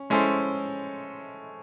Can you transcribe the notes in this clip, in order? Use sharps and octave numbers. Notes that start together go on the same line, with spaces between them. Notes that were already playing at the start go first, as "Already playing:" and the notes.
Already playing: C#4
G#3 C#4 E4 A4 C5